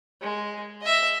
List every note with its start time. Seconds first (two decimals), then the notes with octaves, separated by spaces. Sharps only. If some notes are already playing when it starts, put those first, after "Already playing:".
0.21 G#3
0.82 D#5 E5